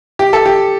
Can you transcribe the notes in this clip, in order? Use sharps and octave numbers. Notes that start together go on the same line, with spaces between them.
G4
A4
G4